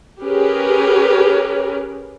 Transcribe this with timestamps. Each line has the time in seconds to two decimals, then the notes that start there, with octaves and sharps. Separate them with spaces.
0.23 C#4 G4 G#4 A#4 B4